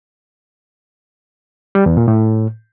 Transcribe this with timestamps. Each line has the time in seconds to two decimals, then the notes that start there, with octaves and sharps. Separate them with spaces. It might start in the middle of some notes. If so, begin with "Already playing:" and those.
1.75 G3
1.86 E2
1.97 A#2
2.08 A2